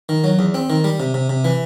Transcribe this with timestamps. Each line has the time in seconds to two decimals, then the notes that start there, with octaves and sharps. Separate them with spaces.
0.09 D#3
0.24 F#3
0.39 E2
0.54 C4
0.70 D#3
0.84 G3
1.00 C3
1.14 C3
1.29 C3
1.45 E3